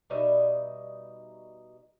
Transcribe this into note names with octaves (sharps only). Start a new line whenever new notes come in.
B2 G3 D#4 E5